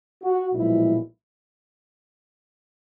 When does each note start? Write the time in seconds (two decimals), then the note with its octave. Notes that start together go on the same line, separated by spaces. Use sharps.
0.23 F#4
0.52 B1 A#2 F3 G#3 E4